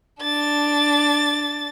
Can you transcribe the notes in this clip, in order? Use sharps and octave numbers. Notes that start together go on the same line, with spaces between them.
D4 A6